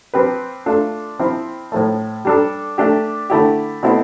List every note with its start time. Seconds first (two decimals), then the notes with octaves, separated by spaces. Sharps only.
0.14 F3 C4 G4 B4
0.66 A3 D4 F4 A4
1.19 F3 C4 E4
1.72 A2 F3 A3
2.25 G3 D4 A4
2.78 A3 D4 G4
3.30 D3 A3 E4 G4
3.83 B2 A3 C4 E4